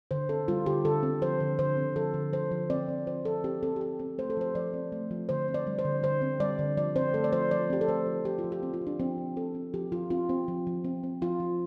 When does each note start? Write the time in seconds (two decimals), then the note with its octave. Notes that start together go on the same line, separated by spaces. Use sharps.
0.11 D3 C5
0.29 C4 A4
0.48 G3 F4
0.66 D3 G4
0.85 D3 A4
1.03 C4
1.22 F3 C5
1.40 D3
1.59 D3 C5
1.77 C4
1.96 F3 A4
2.14 D3
2.33 F3 C5
2.51 F3
2.70 C4 D5
2.89 C4
3.07 F3 C5
3.25 F3 A4
3.44 C4 G4
3.63 C4 A4
3.76 G4
3.81 F3 A4
3.99 C4
4.18 A3 C5
4.30 A4
4.37 F3 C5
4.55 F3 D5
4.74 C4
4.92 A3
5.11 F3
5.29 D3 C5
5.48 C4
5.54 D5
5.67 G3
5.79 C5
5.85 D3
6.03 D3 C5
6.22 C4
6.40 G3 D5
6.59 D3
6.77 F3 D5
6.96 C4 C5
7.14 A3 A4
7.24 D5
7.33 F3 C5
7.51 F3 D5
7.70 C4 G4
7.81 A4
7.88 A3 C5
8.07 F3
8.25 F3 G4
8.39 F4
8.44 F3
8.52 G4
8.63 C4
8.73 F4
8.81 C4
8.87 D4
9.00 F3 C4
9.18 F3
9.37 C4 A4
9.55 C4
9.74 F3 G4
9.92 F3 F4
10.10 C4 F4
10.29 C4
10.48 F3
10.67 F3
10.85 C4
11.03 C4
11.22 F3 F4
11.40 F3